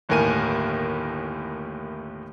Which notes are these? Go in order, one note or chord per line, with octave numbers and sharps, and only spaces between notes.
G1 D#2 A2 A#4 G#5 D#7